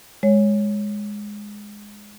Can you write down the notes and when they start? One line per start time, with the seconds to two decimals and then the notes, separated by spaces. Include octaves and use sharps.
0.23 G#3 C#5